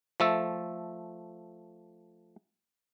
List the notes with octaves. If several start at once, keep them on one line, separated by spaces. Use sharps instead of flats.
F3 A3 A4